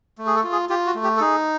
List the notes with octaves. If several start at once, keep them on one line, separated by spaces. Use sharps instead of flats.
A3
G#4
A4
F4
G#4
F4 G4
F#4
A3
G4
A4
D#4 G#4